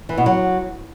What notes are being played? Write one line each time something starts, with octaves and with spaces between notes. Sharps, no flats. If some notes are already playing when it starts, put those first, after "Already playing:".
E3
B2
F#3